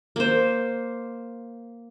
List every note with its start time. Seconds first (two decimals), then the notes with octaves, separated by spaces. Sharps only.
0.16 A#3 C5